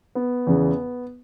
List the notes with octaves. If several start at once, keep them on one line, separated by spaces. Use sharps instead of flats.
B3
E2 C#3 E3